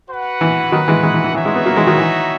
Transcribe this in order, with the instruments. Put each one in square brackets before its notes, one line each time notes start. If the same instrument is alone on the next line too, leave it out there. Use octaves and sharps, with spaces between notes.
[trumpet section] F#4 B4 F#5
[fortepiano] E3
D#3 F#3
E3 G#3
E3 G#3
E3
E3
[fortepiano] E3 [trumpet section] D#4 F#4 C#5 E5
[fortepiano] E3 G#3
G#3 B3
F#3 A#3
E3 G#3
D#3 F#3
E3